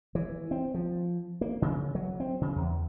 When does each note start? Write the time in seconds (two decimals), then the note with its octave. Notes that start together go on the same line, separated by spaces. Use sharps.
0.15 E3
0.51 C4
0.74 F3
1.41 A#3
1.62 C#3
1.95 F#3
2.20 C4
2.41 C#3
2.56 E2